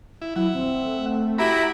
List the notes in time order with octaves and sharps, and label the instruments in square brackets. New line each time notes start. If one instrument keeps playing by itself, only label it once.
[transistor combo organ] E4
[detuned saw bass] F#3 [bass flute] E4 [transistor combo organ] E5 F#5
[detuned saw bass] D#1 [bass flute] C4
[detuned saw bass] A3
[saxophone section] E4 G4 E5 [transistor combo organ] F#4 A#5 B5